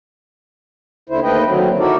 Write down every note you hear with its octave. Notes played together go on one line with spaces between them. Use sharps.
D#2 D3 E4 C5
D#2 A3 B4 D#5 G5
D3 D#3 F#3 C4
D#4 E4 F#4 A4 A#4 D5